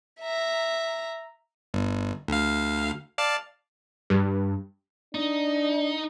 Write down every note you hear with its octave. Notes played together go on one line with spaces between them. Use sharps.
E5 A#5
G1
D2 F5
D5 F5 A5
G2
D4 D#4